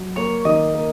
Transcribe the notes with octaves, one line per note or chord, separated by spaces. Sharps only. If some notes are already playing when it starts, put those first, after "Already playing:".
Already playing: F#3
A#3 C#5
D#3 D#5
A#3